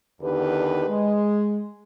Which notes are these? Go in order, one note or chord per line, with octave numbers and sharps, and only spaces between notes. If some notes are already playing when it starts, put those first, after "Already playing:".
E2 D3 D#3 G4 B4
G#3